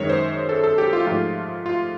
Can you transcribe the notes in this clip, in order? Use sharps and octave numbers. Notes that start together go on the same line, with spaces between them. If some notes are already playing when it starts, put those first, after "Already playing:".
Already playing: F#2 D#3 G#3 C#5
C5
A4
A4
G4
F4
G#2 F3 A3 F4
F4